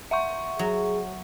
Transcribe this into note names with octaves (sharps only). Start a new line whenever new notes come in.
E5 F#5 C#6
F#3 G#4